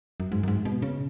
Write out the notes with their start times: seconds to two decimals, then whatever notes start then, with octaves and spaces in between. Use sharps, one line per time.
0.20 F#2
0.32 G#2
0.43 F#2
0.48 G#2
0.65 B2
0.82 C#3